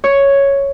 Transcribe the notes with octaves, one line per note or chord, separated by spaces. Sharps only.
C#5